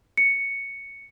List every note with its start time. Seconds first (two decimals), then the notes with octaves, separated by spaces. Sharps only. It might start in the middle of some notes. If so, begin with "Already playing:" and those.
0.17 C#7